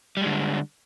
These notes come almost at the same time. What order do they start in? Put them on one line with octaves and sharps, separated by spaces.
G3 G#3 D3